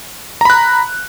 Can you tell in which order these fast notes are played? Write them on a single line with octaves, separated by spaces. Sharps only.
A#5 B5 F#6